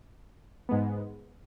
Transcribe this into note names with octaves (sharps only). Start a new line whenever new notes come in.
G#2 G#3 B3